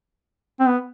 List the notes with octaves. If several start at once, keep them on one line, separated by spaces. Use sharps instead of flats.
C4
B3